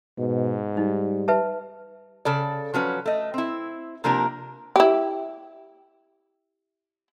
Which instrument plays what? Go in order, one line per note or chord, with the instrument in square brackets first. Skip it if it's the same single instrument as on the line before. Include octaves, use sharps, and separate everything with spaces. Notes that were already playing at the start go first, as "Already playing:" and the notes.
[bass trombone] G#2 [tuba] B2
[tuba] G3 [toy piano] D#4
[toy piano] B4 E5 A5
[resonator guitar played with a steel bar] C#3 A4 D5
F3 F#3 C#4 B4
A3 D#5
C4 E4
C3 F3 A#3 D4 G4 A#4
[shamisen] E4 G4